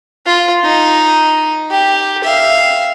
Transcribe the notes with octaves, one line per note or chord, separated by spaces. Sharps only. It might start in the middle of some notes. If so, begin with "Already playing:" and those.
F4
D#4
G4
E5 F5